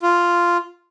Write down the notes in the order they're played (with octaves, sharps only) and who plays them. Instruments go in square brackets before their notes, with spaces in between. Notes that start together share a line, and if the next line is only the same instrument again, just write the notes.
[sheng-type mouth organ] F4